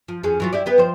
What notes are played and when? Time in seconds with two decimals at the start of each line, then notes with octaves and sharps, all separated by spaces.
0.08 F3
0.23 F2 C#4 G#4
0.40 E3 F#3 F4
0.53 E4 G4 D5
0.66 B3 G4 B4
0.78 F3 C5